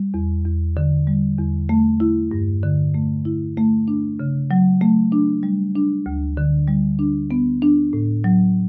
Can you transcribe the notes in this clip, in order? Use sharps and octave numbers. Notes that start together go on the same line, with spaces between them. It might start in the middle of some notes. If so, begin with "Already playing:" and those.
Already playing: G3
E2
E2
D3
G3
E2
A3
E4
G2
D3
A3
E4
A3
D4
C#3
F#3
A3
D4
G3
D4
D2
D3
G3
D4
B3
D4
A2
F#3